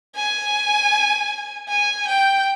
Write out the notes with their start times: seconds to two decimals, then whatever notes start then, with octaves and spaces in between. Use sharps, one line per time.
0.16 G#5
1.69 G#5
2.08 G5